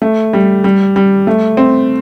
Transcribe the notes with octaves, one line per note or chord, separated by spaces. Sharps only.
A3
G3
G3
G3
A3
C4